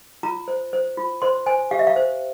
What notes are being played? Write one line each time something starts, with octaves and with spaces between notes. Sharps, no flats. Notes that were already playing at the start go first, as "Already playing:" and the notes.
F4 A#5
C5
C5
F4
C5 C6
C5 G#5
G4 F5
E5
F5
C5